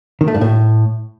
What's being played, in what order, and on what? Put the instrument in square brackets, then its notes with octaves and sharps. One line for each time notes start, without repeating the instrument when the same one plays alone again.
[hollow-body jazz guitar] D#3
A3
G2
A2